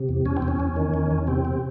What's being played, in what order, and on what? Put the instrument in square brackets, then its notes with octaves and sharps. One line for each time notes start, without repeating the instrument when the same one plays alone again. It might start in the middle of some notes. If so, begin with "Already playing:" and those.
Already playing: [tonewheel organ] C3
E2
E2 C#4
C4
E2
C#4
E2
D#3
E2
E2
C3 C4
C3